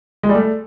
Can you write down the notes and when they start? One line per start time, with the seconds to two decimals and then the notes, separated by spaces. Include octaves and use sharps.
0.23 G#3
0.29 G3
0.35 A3